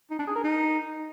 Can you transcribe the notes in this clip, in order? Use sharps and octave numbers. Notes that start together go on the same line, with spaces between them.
D#4
D4
G#4
A#4
D#4